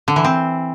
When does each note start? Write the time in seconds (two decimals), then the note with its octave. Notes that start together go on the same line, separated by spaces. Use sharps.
0.08 D3
0.16 E3
0.24 C4